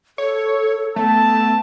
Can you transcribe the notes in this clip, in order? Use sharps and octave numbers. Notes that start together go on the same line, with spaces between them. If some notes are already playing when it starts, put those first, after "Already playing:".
A4 C#5
A3 B3 A5